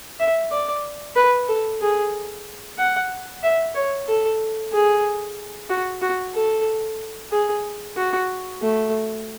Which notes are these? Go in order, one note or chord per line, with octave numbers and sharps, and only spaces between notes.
E5
D5
B4
A4
G#4
F#5
E5
C#5
A4
G#4
F#4
F#4
A4
G#4
F#4
A3